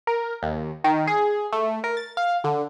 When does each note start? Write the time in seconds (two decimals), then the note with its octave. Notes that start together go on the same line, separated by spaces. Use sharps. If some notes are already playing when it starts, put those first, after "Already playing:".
0.07 A#4
0.43 D#2
0.84 D#3
1.07 G#4
1.53 A3
1.84 A#4
1.97 A6
2.17 F5
2.44 D3